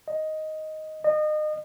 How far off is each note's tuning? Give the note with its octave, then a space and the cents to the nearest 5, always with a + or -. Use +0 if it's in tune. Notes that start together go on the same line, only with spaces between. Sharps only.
D#5 +5
D#5 -30